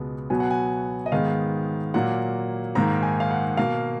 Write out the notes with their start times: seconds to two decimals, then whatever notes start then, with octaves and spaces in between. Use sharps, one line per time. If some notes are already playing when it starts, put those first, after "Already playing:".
Already playing: C#2 B2 G#3 B3
0.30 B2 F#3 B3 G#5
0.40 F#5
0.51 G#5
1.06 D#5
1.12 G#2 D#3 G#3 B3 F5
1.94 A#2 F#3 A#3 F#5
2.75 G#2 D#3 A#3 A#5
3.03 G#5
3.20 F5
3.31 F#5
3.57 B2 A#3 F5